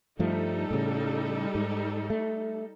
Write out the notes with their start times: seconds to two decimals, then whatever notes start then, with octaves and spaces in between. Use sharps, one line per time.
0.19 G2 F3 G3 A3 D#4 A4
0.71 A2 C#3
1.55 G#2
2.10 A3